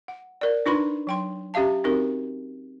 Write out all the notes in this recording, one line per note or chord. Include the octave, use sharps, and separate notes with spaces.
F#5
A#4 D5
D4 D#4 F4 B4 B5 C6
F#3 G5 C6
C#4 G4 E5 F5 A5
C4 D#4 F#4 G4 A#4